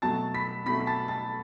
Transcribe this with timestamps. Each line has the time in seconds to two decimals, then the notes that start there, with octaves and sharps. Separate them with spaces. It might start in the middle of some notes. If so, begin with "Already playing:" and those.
0.02 B2 F#3 A3 A5 A6
0.34 B5 B6
0.66 B2 F#3 A3 B5 B6
0.80 B6
0.87 A5 A6
1.08 A5 A6